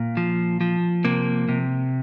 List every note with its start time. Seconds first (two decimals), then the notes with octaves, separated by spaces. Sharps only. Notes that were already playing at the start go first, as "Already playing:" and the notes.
Already playing: A#2
0.17 F3
0.61 F3
1.05 C3 A#3
1.49 C3